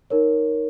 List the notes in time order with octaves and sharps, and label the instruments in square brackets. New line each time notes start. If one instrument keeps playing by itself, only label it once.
[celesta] D#4 A#4 C#5